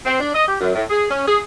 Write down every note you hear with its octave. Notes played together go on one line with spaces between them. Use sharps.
C4
D4
D#5
G4
F#2
A2
G#4
C#4
G#4